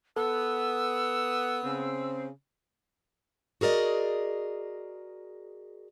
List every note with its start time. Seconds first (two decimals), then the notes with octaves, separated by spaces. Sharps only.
0.17 B3 A4 E6
1.63 C#3 C4
3.61 F#4 G#4 A#4 D5 D#5